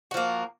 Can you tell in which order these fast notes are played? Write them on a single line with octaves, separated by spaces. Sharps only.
F#4 F3 A#3